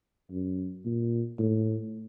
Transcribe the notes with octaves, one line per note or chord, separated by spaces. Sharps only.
F#2
A#2
A2